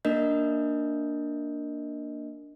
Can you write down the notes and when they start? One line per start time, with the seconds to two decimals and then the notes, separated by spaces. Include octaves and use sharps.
0.05 A#3 D4 A#4 D#5 G6